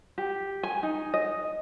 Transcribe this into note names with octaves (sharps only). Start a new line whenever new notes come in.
G4
G#5
D#4
D#5